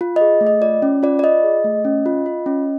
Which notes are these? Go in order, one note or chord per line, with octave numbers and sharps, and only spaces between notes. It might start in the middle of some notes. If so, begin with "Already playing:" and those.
F4
G#4 D#5
A3
D#5
F4 D5
C#4
F4 D5
D5
F4 D#5
G#4
A3
C#4
F4
F4
C#4